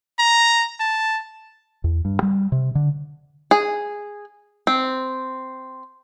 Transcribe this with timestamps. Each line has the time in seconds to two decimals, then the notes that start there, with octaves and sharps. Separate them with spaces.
0.19 A#5
0.80 A5
1.84 E2
2.05 G2
2.22 G3
2.52 C3
2.75 D3
3.51 G#4
4.67 C4